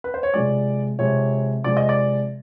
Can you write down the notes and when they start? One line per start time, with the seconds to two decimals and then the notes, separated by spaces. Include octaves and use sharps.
0.04 B4
0.14 C5
0.23 C#5
0.34 C3 F3 G#3 D5
0.99 C3 F3 G#3 C#5
1.64 C3 F3 G#3 D5
1.77 D#5
1.89 D5